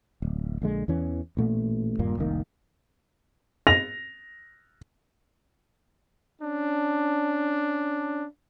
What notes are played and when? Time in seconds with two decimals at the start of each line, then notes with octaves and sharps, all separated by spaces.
0.22 D1
0.62 A#1 D3 G#3
0.88 E2 E3 C#4
1.37 A1 A#2 A3
1.99 D#1 G2 A#2 A#3
2.17 F1 C2 D#3 A#3
3.67 A#6 F7
6.42 C#4 D4